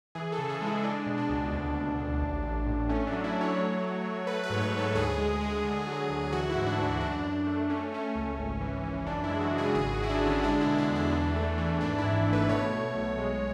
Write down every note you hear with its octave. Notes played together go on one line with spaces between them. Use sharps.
E3 G#4
A4
C#3
G#4
G#3
E4
G#3 D4
B2
D4
C#2
D2
D2
D2
A1
A1
A2
A3 C#4
D4
F#3
E4
A3
C#5
F#3
F#3
F#3
A3 B4
B4
G#2 C#5
B4
G#2
A4
D2 G#4
G#3
G#3
D3
F#3
D2
E3 F#4
E4
G#2
D4
E3 D4
F#2 D4
F#2
A3
A3 C#4
A3 C#4
C#2
G#1
E3
E3
F#2 D4
E4
G#3
F#4
C#3
G#4
G#1 G#4
F#4
G#1 E4
D4
D3
C#4
G#3 D4
E4
B2
D4
E2
D4
E3
A3
E3
G#1 D4
E4
G#2
A3
B4
B2 C#5
B2
B1
G#3